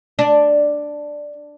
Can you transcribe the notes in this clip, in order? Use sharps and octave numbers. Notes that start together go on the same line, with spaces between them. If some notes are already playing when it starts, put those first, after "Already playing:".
D4